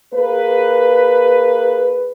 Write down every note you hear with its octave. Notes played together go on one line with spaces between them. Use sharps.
A#3 G#4 B4